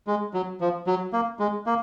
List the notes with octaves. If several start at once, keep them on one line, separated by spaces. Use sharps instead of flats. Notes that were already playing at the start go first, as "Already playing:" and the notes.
G#3
F#3
F3
F#3
A#3
G#3
A#3